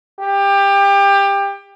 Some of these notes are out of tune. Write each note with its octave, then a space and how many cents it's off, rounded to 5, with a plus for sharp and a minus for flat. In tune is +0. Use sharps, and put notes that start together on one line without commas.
G4 +25